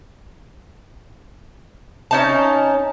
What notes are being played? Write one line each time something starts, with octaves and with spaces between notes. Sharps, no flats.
C#4 D#4 A5